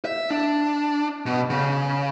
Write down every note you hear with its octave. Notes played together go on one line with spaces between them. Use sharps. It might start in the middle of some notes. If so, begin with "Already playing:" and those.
E5
D4
B2
C#3